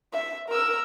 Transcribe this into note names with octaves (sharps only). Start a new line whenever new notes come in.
E5
A#4 E6